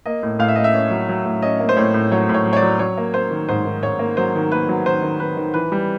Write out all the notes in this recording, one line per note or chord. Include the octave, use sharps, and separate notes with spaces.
A#3 D#5
A2
A2 F5
E5
A#3 D#5
E5
C#4
F#3
F#3
A2
C#4 D#5
A#3
C5
A2 C#5
A2
F#3 C#5
A2
C#5
F#3
C#5
D5
F#3
F#3 C#5
A#3
A#3 C5
D#3
G#2 C5
D#3
G#2 C#5
A#3
F#3 C5
D#3
A#3 B4
F#3
D#3 C5
D#3
D#3 B4
D#3
E3 B4
G3